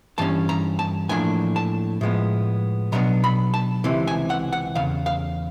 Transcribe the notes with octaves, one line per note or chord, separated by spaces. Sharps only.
G2 E3 C#4 A5
A#5
A5
A2 F3 A#3 D4 G#5
A5
A2 F3 G#3 B3
B2 F#3 B3 D4 A#5
B5
A5
C#2 C3 E3
G#5
F#5
F#5
E2 C#3 F5
F5